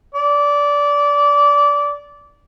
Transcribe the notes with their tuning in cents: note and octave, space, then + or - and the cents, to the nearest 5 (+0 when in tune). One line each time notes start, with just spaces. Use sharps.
D5 -20